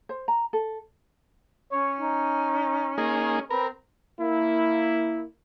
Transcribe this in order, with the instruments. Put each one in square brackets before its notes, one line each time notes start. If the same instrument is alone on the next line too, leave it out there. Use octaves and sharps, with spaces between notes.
[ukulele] C5
A#5
A4
[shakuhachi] C#4 [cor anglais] C#5
[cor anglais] D#4
[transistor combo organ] A#3 D#4 G#4
[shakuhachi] C4 [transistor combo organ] A#4 [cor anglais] B4
[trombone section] A#3 E4